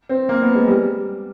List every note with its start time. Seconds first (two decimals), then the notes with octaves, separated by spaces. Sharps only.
0.09 C4
0.29 A#3
0.42 B3
0.55 G#3
0.68 G3